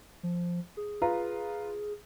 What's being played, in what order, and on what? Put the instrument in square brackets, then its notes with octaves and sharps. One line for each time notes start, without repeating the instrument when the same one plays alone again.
[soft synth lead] F3
G#4
[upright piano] F4 B4 A#5